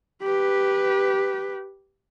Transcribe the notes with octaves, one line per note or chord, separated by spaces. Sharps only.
G4 B4